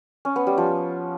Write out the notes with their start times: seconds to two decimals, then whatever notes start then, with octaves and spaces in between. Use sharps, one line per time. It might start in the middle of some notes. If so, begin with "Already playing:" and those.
0.25 C#4
0.36 B3
0.47 G3
0.58 F3